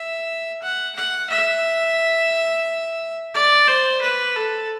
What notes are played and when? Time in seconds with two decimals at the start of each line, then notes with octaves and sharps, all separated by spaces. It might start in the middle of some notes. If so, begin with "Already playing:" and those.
Already playing: E5
0.62 F#5
0.96 F#5
1.30 E5
3.34 D5
3.67 C5
4.02 B4
4.36 A4